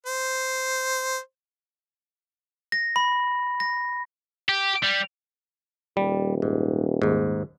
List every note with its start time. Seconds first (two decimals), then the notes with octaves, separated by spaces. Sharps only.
0.06 C5
2.72 A#6
2.96 B5
3.60 A#6
4.49 G4
4.83 G3
5.97 D#1 G3
6.42 G#2
7.02 D#2 G#2